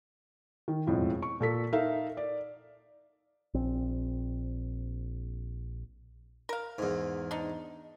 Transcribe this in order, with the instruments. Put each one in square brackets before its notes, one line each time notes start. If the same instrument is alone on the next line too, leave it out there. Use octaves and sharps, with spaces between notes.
[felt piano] D#3
E1 F2 A2 F4
C#6
A#2 A4 B6
D#4 A4 A#4 E5 F5
D5
[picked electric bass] A#1 C4
[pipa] A#4 F5
[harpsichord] E2 G#2
[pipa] D4 D#4